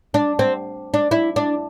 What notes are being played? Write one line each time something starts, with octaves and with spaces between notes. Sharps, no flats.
D4
C4
D4
E4
D4